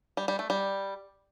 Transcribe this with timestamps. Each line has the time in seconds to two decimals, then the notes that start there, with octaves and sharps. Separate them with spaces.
0.17 G3
0.28 G3
0.39 A3
0.50 G3